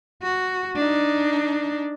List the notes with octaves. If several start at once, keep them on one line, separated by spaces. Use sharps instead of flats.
F#4
D4 D#4